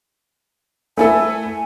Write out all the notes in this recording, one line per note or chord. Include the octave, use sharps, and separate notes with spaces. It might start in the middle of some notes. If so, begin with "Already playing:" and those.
A3 E4 A4 G#5